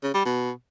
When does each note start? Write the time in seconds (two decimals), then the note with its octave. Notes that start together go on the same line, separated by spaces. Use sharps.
0.03 C#3
0.14 G3
0.25 B2